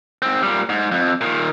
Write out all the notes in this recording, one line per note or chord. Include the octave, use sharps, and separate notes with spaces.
G#2 C4
A#2 G3
G#2
F2
A#2 D#3